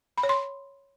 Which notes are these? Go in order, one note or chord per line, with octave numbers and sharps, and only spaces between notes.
B5
C#5
C6